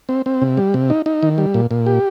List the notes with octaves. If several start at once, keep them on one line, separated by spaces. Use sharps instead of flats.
C4
C4
C3
G3
C3
D#4
D#4
D#3
G3
A#2
A#2
G4